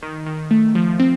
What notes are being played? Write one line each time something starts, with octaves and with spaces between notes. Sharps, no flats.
D#3
D#3
A3
F3
C4